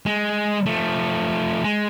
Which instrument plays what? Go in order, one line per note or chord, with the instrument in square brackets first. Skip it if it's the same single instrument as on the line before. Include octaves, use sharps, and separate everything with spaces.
[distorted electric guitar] G#3
F3 A3
G#3